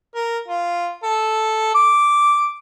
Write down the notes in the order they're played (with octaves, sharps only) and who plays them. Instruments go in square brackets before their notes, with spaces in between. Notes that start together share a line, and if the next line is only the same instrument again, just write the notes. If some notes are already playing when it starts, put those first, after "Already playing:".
[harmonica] A#4
F4
A4
D6